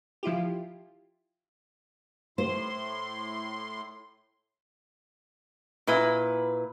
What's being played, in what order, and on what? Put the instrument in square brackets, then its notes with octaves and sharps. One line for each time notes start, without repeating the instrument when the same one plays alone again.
[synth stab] F3 E4 F4 G4
[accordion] A2 C6 [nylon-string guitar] C5
[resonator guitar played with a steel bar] A#2 E4 B4